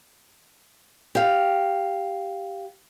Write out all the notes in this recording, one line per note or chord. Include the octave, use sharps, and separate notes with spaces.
G4 F5